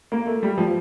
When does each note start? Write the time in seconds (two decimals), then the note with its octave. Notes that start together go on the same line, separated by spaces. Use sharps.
0.12 A#3
0.27 A3
0.43 G3
0.58 F3